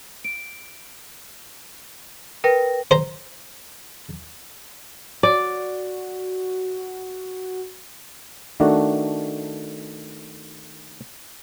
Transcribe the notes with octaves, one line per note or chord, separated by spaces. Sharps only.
D7
A#4 B4 G5 A#6
C5 A#5
F#4 D5
D#3 A3 D4 F#4